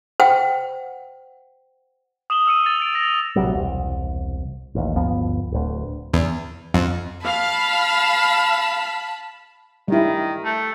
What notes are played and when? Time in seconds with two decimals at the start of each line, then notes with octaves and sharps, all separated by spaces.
0.20 C5 F#5 G5
2.30 D#6 E7 F#7 G7
2.46 D#6 E6 C#7 D#7
2.66 A6 F7
2.80 A6 D7
2.93 A6 A#6 D#7 F7
3.36 A#1 C3 F#3 G3
3.53 E1 C2
4.75 A1 D#2
4.95 G1 D2 F3 B3
5.52 D1 D2
6.14 E2
6.74 F2
7.25 F5 A5 B5
9.88 D#3 G3 E4
10.44 A3